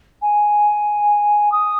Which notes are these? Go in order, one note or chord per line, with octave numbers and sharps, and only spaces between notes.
G#5
D#6